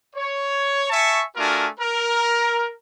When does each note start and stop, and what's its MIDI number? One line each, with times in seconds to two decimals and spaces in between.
0.16 0.89 73
0.90 1.24 76
0.90 1.24 80
0.90 1.24 81
0.90 1.24 85
1.36 1.67 57
1.36 1.67 62
1.36 1.67 65
1.36 1.67 66
1.36 1.67 70
1.36 1.67 80
1.79 2.71 70